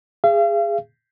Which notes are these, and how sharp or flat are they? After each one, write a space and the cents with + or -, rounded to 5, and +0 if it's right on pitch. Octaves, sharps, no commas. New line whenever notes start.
G#4 -15 F5 -40